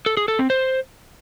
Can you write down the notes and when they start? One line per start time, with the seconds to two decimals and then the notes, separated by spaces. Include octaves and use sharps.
0.06 A4
0.17 G#4
0.28 A4
0.39 C4
0.50 C5